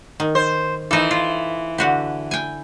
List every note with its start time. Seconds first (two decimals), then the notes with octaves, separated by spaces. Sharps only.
0.20 D#3
0.35 C5
0.91 E3 D#4 A4
1.11 F4
1.78 D3 F#4 G4
2.31 G5 G#5